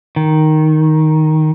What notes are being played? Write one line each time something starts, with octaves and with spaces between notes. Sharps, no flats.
D#3